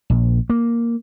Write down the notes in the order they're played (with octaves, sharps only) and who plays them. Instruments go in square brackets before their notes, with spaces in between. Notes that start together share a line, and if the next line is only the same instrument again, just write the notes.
[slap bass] A#1
A#3